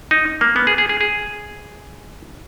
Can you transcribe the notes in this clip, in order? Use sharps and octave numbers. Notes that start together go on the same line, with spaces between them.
D#4
A#3
B3
G#4
G#4
G#4
G#4